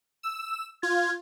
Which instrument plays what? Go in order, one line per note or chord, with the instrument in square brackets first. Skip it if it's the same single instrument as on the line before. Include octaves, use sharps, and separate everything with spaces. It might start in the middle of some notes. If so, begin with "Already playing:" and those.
[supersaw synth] E6
[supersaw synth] F4 [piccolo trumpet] G#6